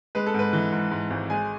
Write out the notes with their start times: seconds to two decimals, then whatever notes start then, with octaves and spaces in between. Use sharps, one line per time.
0.15 G#3 B4
0.27 A4
0.34 G#2 B4
0.53 E3
0.72 G#2
0.91 G#2
1.10 G#1
1.30 G#3 G#5